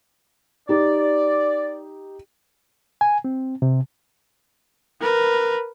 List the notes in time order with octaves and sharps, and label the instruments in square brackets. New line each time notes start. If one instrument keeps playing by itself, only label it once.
[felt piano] D#4 G4 [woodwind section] D5
[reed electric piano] G#5
C4
C3
[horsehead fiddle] A#4 B4